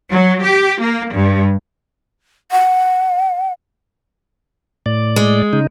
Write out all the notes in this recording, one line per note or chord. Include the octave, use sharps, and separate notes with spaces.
F#3
G4
A#3
G2
F#5
A2 D5
G#3
C#3 D#4